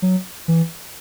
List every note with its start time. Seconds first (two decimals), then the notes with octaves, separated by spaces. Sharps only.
0.02 F#3
0.48 E3